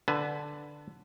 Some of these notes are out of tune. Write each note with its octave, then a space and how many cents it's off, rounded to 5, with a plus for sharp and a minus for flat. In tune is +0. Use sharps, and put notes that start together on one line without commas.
D3 +5 B4 +0 A5 -45